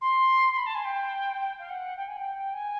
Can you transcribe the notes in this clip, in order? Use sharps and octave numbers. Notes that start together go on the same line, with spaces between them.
C6
B5
A5
G#5
G5
G5
F5
F#5
G5
G#5
G5
G#5